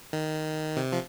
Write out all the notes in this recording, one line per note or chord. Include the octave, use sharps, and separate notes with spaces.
D#3
C3
F3